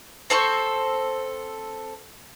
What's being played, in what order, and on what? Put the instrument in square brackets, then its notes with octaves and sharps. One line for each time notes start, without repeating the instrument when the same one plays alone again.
[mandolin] C4 A4 C5 C#6